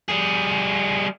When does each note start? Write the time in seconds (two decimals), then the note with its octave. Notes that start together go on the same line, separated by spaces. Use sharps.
0.09 G3 G#4